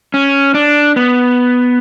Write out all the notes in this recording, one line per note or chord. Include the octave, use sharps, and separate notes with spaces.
C#4
D4
B3